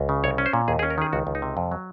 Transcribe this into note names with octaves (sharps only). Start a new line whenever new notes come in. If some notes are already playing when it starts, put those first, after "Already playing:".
Already playing: C#2
C#3
C2 C#5
C#4
C5
A#2
D#2 G#4
G#4
C#4
A#4
D#3 G#4
C#2 F#4
C#2
D#4
C3
F2
F#3